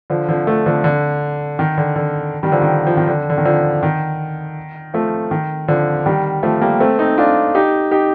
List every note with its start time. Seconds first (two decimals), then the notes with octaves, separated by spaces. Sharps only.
0.10 D3 F3
0.29 D3 F3
0.47 F3 A3
0.66 D3 F3
0.84 D3
1.59 D#3
1.78 D3
1.96 D3
2.43 D#3 G3
2.52 D3 F3
2.62 D#3
2.87 F3
2.97 D#3
3.08 D3
3.30 D3
3.37 D#3
3.45 D3 F3
3.83 D#3
4.94 F3 A3
5.31 D#3
5.68 D3 F3
6.06 D#3 G3
6.43 F3 A3
6.62 G3 A#3
6.80 A3 C4
6.99 C4 D#4
7.18 D4 F4
7.55 D#4 G4
7.91 D#4 G4